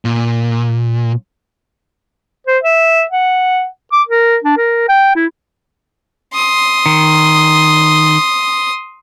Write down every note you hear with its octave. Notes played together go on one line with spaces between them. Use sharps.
A#2
C5
E5
F#5
D6
A#4
D4
A#4
G5
E4
C6 D#6
D#3